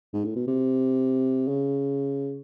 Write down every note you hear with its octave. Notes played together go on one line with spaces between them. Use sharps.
G#2
A2
B2
C3
C#3